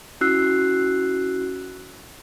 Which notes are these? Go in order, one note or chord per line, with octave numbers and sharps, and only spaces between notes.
C#4 E4 F#4 E6 F#6 C7